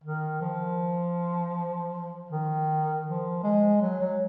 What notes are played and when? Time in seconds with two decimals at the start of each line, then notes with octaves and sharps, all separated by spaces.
0.04 D#3
0.41 F3
2.31 D#3
3.07 F3
3.43 G#3
3.81 F#3
4.01 F#3